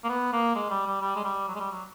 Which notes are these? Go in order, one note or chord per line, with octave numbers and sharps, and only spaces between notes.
A#3
B3
A#3
G#3
G3
G3
G3
G#3
G3
F#3
G#3
G3
F#3